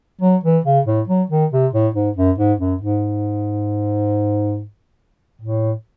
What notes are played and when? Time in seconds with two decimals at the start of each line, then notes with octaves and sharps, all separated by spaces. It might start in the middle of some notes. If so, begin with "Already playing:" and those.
0.21 F#3
0.44 E3
0.64 C#3
0.86 A2
1.08 F#3
1.30 D#3
1.52 C3
1.73 A2
1.95 G#2
2.16 F#2
2.38 G#2
2.60 F#2
2.81 G#2
5.42 A2